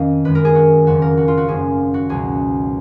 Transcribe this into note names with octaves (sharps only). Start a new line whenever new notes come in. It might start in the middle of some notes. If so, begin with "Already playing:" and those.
Already playing: F2 D#3 A#3 C#4 D#5 F5
F#2 D#3 G#3 B4
A#4
G#4
F#4
F#1 F2 F3 F#4
A#4
F#4
F4
F#4
G#1 F#2 F3 A#3 C#4 G#4
F#4
C#2 B2 F#3 G#4